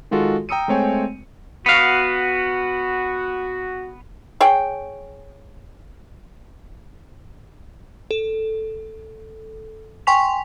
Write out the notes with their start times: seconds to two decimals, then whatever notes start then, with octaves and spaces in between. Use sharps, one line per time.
0.11 D#3 G#3 F4 F#4 A4
0.49 G5 A#5 D#6 E6 C#7 D#7
0.68 G#3 A3 C4 C#5 G5 G#5
1.66 B3 F#4 F5
4.41 G#4 C#5 G5
8.11 A4
10.07 G5 G#5 C6 C#6 B6 F7